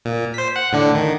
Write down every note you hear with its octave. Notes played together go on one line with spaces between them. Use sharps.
A#2
C5 B6
F#5
A2 D3 D4
D#3